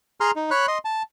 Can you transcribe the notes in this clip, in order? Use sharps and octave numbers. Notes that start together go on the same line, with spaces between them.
G#4 A#5 C6 F6
D#4
C#5 B5 F#6
D#5 C6
A5